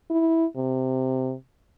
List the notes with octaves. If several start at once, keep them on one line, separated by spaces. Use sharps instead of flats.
E4
C3